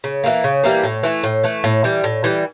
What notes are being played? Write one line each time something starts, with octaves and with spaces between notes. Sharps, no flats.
C#3
E3 G3 A#3
C#3
E3 G3 A#3
A2
E3 A3
A2
E3 A3
A2
E3 G3
A2
E3 G3